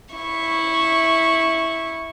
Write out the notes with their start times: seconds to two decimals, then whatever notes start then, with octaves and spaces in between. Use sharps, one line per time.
0.15 E4 C#6